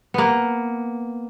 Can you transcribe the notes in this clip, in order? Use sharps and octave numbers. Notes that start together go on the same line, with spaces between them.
A#3 B3